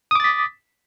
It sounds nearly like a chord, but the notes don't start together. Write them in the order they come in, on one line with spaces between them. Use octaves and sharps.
D#6 D6 A6 B6